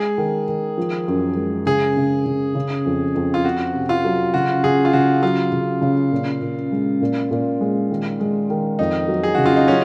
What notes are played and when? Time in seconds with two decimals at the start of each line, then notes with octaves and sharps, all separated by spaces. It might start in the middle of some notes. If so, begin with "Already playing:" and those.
Already playing: G#3 G#4
0.18 D#3
0.48 D#3
0.78 F3
1.08 F#2
1.36 G#3
1.66 C#3 G#4
1.97 C#3
2.26 C#3
2.55 C#3
2.86 F2
3.15 F2
3.34 F4
3.44 C4 F#4
3.74 C3
3.89 F4
4.05 F#3
4.34 C#3 F#4
4.64 C#3 G#4
4.85 F4
4.93 C#3 F#4
5.22 F#3 F4
5.52 C#3
5.82 C#3
6.12 A#2
6.41 A#2
6.72 G#3
7.01 A#2
7.31 A#2
7.61 G#3
7.91 D#3
8.20 G#3
8.50 D#3
8.79 F2 D#4
9.08 F#3
9.23 G#4
9.35 C#3 F#4
9.46 F4
9.56 D#4
9.68 F#3 C#4